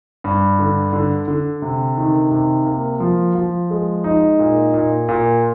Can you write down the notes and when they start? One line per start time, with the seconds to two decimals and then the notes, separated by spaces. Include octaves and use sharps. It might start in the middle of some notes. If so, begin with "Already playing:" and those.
0.24 G2
0.59 D3
0.93 D3
1.28 D3
1.62 C3
1.97 D#3
2.31 C3
2.66 A#3
3.00 F3
3.35 F3
3.70 G#3
4.04 D#4
4.39 A#2
4.74 A#2
5.09 A#2